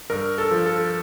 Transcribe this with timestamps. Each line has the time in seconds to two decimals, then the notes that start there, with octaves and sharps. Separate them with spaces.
0.10 G2 A#4
0.38 A4
0.51 F3
0.66 A4